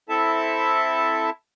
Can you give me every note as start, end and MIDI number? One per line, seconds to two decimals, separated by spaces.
0.09 1.30 60
0.09 1.30 64
0.09 1.30 69
0.09 1.30 76
0.09 1.30 81